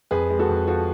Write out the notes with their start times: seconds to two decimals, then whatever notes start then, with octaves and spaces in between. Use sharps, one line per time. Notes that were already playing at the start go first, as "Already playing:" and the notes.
0.11 F2 G#4 B4
0.30 G#3
0.39 F#4 A4
0.49 F2
0.67 F3 F#4 A4